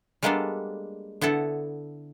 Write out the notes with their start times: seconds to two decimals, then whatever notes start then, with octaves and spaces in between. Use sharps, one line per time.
0.23 G3 G#3 A#3 B3 D4 A4
1.21 D3 B3 E4 A4 F#5